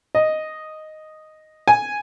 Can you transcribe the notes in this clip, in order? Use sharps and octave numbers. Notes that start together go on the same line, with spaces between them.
D#5
G#5